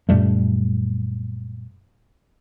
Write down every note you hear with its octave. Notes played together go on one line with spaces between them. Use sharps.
F#2 A#2 G3 A3